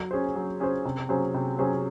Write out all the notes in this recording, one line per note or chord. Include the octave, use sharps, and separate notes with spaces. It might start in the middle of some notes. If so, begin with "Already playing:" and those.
Already playing: F#3
C#4 G#4 C5
F#3
C#4 G#4 C5
C3
F#3 C#4 G#4 C5
C3
F#3 C#4 G#4 C5